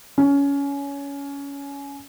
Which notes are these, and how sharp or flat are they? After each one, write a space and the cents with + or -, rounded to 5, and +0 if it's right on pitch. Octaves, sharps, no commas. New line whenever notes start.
C#4 +20